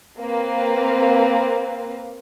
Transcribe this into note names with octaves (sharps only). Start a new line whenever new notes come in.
A#3 C4 B4 F5